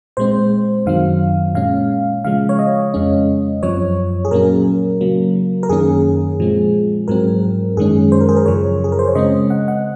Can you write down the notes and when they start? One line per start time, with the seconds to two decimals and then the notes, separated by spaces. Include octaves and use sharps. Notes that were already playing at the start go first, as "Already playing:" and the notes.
0.17 A#2 G#3 C4 C5
0.86 F#2 D#3 F#3 C4 F5
1.55 A#2 G#3 C#4 F5
2.24 C#3 F3 G#3 F5
2.49 C#5
2.59 D#5
2.94 F2 C#3 G#3 C#4
3.63 F#2 F3 C4 C#5
4.25 G#4
4.31 A#2 F#3 A#3 C#4 A#4
5.01 C#3 F#3 A#3
5.63 A#4
5.69 F#2 D#3 A#3 C#4 G#4
6.40 A#2 F3 G#3 C4
7.08 G#2 F#3 C4 A#4
7.77 F#2 D#3 G#3 C#4 G#4
8.12 C5
8.21 A#4
8.29 G#4
8.37 A#4
8.46 F#2 C#3 F3 C#5
8.84 G#4
8.92 A#4
8.99 C5
9.07 C#5
9.15 C#3 G#3 C4 D#5
9.50 F#5
9.68 F#5